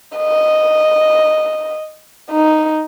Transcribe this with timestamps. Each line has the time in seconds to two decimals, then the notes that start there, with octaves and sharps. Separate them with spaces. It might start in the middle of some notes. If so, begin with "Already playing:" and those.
0.17 D#5
2.31 D#4